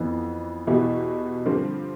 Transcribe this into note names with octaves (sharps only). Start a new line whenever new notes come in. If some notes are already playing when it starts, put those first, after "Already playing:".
Already playing: F2 E3 B3
E2 B2 B3 E4 G4
G2 D3 F3 C4 G4